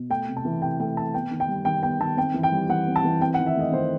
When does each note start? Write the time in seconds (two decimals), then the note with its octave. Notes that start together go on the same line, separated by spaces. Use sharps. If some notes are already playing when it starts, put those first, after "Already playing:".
Already playing: B2
0.10 A3 G5
0.28 C3
0.37 A5
0.45 E3
0.62 C3 G5
0.79 A3 G5
0.97 C3 A5
1.14 B3 G5
1.31 D#3
1.40 G5
1.48 G3
1.65 D#3 G5
1.82 B3 G5
2.00 D#3 A5
2.17 C4 G5
2.34 E3
2.43 G5
2.52 G3
2.69 E3 F#5
2.87 C4
2.96 A5
3.04 E3
3.21 C4 G5
3.34 F#5
3.39 D#3
3.46 E5
3.56 A3 D#5
3.72 D#3 C5